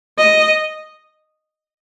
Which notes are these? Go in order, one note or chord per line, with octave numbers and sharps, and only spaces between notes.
D#5